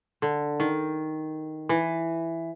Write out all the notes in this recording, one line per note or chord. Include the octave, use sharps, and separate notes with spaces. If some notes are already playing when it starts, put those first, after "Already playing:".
D3
D#3
E3